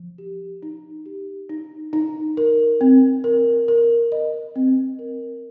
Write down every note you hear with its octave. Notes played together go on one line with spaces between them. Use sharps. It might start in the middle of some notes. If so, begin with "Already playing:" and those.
Already playing: F3
G4
D#4
G4
D#4
D#4
A#4
C4
A#4
A#4
D#5
C4
A#4